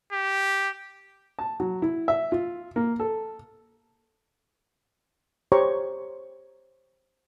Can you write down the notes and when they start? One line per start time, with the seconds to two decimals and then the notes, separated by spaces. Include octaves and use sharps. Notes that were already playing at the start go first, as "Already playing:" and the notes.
0.13 G4
1.39 A5
1.60 F#3
1.82 E4
2.08 E5
2.32 F4
2.76 A#3
3.00 A4
5.52 G4 C5 C#5 G5 A#5 C#6